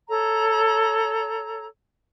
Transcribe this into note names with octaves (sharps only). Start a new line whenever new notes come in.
A4 C#5 A#5